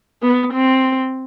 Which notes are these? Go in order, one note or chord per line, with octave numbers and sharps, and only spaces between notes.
B3
C4